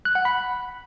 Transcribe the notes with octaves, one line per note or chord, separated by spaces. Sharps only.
F#6
F#5
B5